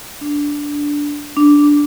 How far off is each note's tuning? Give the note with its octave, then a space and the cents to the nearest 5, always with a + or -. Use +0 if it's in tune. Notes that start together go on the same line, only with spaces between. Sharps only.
D4 -10
D4 -5